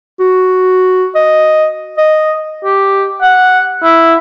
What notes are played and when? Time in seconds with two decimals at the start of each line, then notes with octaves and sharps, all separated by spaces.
0.20 F#4
1.15 D#5
1.97 D#5
2.64 G4
3.22 F#5
3.83 E4